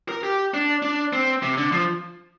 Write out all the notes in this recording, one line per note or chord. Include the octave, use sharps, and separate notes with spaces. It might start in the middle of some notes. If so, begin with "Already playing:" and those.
A#4
G4
D4
D4
C4
C3
D3
F3